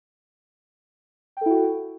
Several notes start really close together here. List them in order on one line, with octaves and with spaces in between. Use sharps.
G5 A4 E4 F#4